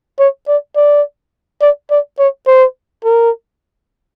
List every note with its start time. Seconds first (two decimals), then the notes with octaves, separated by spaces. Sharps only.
0.19 C#5
0.48 D5
0.76 D5
1.62 D5
1.91 D5
2.19 C#5
2.47 C5
3.05 A#4